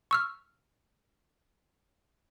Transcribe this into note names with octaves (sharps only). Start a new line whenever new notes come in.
C#6 E6 F6